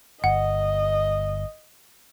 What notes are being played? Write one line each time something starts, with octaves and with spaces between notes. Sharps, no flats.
G1 D#5 F#5